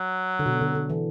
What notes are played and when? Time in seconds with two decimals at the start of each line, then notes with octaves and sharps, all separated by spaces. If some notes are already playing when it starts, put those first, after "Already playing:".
Already playing: F#3
0.39 D3
0.46 B2
0.61 D3
0.75 D3
0.90 E3